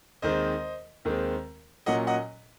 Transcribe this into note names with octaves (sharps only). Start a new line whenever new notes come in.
D#2 D#3 G#3 C4 C5 D#5
D#2 D#3 G#3 C4
A#2 F#3 C#4 D#5 F#5
D#5 F#5